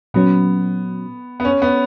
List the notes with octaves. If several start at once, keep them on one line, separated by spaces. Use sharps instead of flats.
A#2 F#3 B3 C#4
B3
C#4
B3